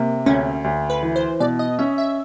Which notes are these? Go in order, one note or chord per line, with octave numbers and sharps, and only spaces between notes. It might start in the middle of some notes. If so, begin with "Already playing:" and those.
Already playing: C3 A#3
D2 C#4
D2
B4
E3
C5
B2 D5
D#5
C#4 E5
E5